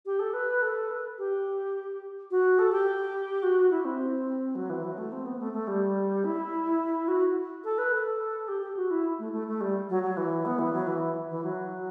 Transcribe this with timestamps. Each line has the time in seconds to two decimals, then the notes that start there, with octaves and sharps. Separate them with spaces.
0.05 G4
0.19 A4
0.33 B4
0.61 A4
0.90 B4
1.18 G4
2.30 F#4
2.58 A4
2.72 G4
3.42 F#4
3.70 E4
3.84 C4
4.55 F#3
4.69 E3
4.83 F#3
4.97 A3
5.12 C4
5.25 B3
5.39 A3
5.53 A3
5.67 G3
6.24 E4
7.08 F#4
7.64 A4
7.78 B4
7.92 A4
8.48 G4
8.62 G4
8.76 F#4
8.90 E4
9.19 A3
9.32 A3
9.47 A3
9.60 G3
9.89 F#3
10.03 F#3
10.17 E3
10.45 B3
10.58 E3
10.72 F#3
10.87 E3
11.30 E3
11.43 F#3